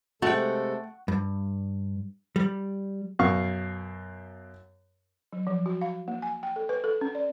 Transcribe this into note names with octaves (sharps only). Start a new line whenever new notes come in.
C3 G#3 A3 F#4 A4 F#5 G5
G2
G3
F#2 B2 F5 C#6
F#3
F3
F#4
F5
A#3
G#5
G5
A4
B4
A4
C#4
D5